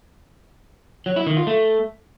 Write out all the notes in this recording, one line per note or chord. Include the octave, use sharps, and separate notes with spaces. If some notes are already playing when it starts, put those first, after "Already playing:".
F#3
E4
D#3
F4
A3